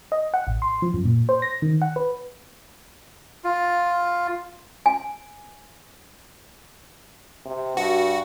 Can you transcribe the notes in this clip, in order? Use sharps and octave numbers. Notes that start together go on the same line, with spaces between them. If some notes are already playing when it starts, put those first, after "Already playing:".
D#5
F#5
A1
C6
F3
F#2
A#2
C5
A#6
D#3
F#5
B4
F4
G#5
C3
G2 F#4